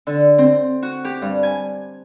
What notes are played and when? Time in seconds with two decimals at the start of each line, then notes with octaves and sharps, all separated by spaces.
0.07 D3
0.38 C4
0.83 F#4
1.05 G4
1.22 G2
1.43 G#5